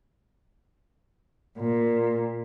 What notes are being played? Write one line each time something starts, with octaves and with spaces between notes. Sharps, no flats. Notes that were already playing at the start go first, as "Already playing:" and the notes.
A#2